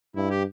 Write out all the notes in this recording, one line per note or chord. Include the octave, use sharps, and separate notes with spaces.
G2 E4
G4